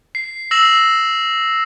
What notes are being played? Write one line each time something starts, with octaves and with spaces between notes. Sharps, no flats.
C7
E6 A#6 C7 E7 F#7